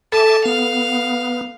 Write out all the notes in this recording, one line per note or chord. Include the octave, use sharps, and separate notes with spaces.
A4 E5 G#5 A5 D6
B3 F5